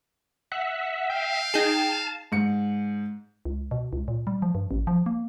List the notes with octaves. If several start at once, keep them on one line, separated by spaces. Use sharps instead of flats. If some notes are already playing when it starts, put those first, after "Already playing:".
E5 F#5
F5 G5
D#4 G#4 A5
G#2 C#7
C#2
B2
C#2
A#2
G3
F3
G2
A1
F3
A#3